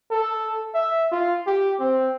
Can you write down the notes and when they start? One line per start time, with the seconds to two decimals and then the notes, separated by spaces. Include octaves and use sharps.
0.11 A4
0.75 E5
1.12 F4
1.47 G4
1.80 C4